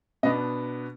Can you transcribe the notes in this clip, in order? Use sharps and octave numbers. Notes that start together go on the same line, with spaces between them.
B2 B3 D4 D#5